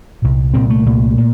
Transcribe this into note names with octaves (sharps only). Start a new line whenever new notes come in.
C2 A#2
C2 A#2 C4
A3
C2 A#2
A#2